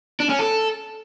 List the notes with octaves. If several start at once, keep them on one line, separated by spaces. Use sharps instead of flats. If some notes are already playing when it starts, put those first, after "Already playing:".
D4
C#4
A4